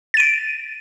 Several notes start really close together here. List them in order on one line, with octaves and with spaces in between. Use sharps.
A6 D#7 D7